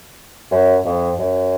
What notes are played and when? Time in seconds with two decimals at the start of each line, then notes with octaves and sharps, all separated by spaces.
0.51 F#2
0.85 F2
1.19 F#2